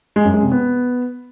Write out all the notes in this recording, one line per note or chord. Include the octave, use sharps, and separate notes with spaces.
G#3
F#2
G#3
C3
B3